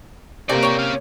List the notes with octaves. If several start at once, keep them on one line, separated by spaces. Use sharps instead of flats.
C3 A3 A#3 C4 A4 A#4 D5
C#5 G5
C#4 F5